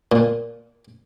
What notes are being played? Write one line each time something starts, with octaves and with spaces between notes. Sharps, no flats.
A#2